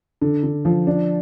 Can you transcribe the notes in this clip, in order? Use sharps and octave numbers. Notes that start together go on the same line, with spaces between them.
D3
D3
F3
D4